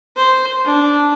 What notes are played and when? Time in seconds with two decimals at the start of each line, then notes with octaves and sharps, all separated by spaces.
0.16 C5
0.65 D4